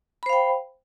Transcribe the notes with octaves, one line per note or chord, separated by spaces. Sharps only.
C5 F5 G5 B5